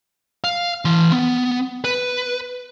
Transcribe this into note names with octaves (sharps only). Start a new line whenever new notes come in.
F5
E3 C6
B3
B4